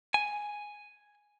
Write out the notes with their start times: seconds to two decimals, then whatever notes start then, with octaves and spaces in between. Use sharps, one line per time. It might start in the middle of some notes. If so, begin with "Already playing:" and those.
0.14 G#5